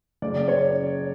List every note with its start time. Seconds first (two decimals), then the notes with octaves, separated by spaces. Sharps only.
0.22 F#1 D5
0.48 C#5